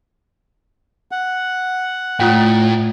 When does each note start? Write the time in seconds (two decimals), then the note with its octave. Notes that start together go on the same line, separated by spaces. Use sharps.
1.11 F#5
2.20 A2 A3 F4 F#5 G5